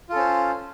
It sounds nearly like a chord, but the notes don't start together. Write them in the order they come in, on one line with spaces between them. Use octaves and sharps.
F4 A4 C#4 C5